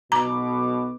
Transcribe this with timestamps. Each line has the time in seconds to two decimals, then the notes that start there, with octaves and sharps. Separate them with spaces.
0.12 B1 B2 A#5 D6